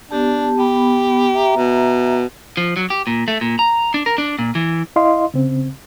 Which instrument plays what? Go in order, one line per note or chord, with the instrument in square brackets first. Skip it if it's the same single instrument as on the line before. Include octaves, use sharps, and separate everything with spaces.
[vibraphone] B3 G4 A5 [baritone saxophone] D4
[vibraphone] B3 B5 [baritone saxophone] G4
[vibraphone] E5 A#5
[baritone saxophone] B2
[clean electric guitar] F3
F#3
G4
A#2
A3
A#2
A#5
D4
A#4
D4
A#2
E3
[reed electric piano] E4 D#5 F5 C6
C#3 C4